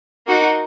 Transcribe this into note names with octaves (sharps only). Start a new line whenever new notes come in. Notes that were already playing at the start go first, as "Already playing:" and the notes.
A#3 D#4 F#4 A#4